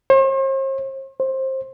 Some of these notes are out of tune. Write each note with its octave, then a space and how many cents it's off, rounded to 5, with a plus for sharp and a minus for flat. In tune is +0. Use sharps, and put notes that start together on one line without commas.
C5 +45
C5 +20